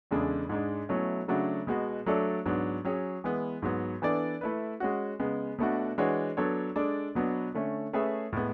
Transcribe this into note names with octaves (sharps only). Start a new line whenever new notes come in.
E2 C#3 G#3 D4 A4
G#2 G#3 D4
B2 F#3 A3 C#4 E4
C#3 F#3 A3 D4 F#4
B2 G#3 B3 F#4
F#3 A3 D4 A4 D5
G#2 F#3 B3 D4
F#3 C#4 G#4
E3 G#3 B3
G#2 F#3 B3
E3 B3 D4 A4 D5
A3 E4 B4
G#3 C#4 F#4
C#3 G#3 B3
B2 A3 D4 F#4
E3 G#3 D4 F#4 C#5
F#3 B3 D4 A4 C#5
G#3 D4 A4 D5
B2 F#3 B3 D4
D3 A3 C#4
A3 C#4 G#4 B4 E5
A2 G#3 B3